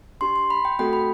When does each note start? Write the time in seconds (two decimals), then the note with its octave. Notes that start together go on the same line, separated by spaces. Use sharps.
0.21 D4 G4 C6
0.36 C6
0.50 B5
0.65 G5
0.79 A3 C4 F#4 A4 G5
0.93 B5